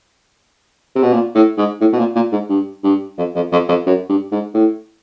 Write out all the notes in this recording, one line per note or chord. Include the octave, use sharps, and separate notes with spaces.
C3
B2
A#2
A2
G#2
A2
B2
A#2
A#2
G#2
G2
G2
F2
F2
F2
F2
F#2
G2
G#2
A2